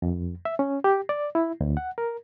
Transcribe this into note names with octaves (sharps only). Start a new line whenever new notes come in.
F2
E5
C#4
G4
D5
E4
D2
F#5
A#4